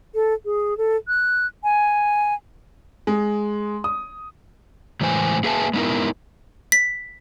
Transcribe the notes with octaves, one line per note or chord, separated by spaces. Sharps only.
A4
G#4
A4
F#6
G#5
G#3
D#6
A2 E3 G#3 C5 G#5
A#3 G#4 B4 E5 G#5 A5
G#3 B3 D#4 E4 A#4
B6